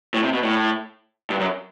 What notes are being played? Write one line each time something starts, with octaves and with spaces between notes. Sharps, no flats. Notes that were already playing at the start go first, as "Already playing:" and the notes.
A2
C3
B2
A2
G2
F#2